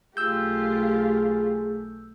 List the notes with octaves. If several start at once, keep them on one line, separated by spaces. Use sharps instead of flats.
B1 A3 F4 G4 G#4 E6 G6